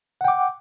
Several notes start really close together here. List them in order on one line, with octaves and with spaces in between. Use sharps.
F#5 G5 D6